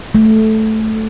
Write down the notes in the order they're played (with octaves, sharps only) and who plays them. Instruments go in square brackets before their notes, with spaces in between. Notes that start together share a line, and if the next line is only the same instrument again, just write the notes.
[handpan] A3